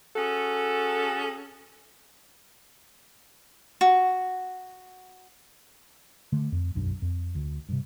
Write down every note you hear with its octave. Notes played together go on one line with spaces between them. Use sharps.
C#4 F#4 G#4 A4
F#4
D3 A3
F2
E1 B1 F#2 D4
F2
D2
G2 C3